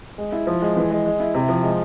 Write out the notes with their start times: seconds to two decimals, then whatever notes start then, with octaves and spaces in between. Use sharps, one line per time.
0.18 G#3
0.32 E4
0.47 F3
0.62 G#3
0.77 E3
0.91 G#3
1.05 G#3
1.20 E4
1.34 C3
1.49 F3
1.63 G#3